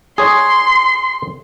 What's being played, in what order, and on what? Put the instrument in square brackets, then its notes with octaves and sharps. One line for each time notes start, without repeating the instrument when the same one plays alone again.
[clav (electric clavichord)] G#4 C#5 [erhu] C6